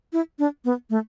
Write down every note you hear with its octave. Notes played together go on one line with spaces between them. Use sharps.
E4
D4
B3
A3